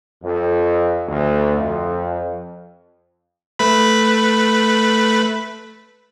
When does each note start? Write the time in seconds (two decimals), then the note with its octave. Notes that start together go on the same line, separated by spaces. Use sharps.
0.22 F2
1.08 D2
1.56 F2
3.59 A3 B4 B5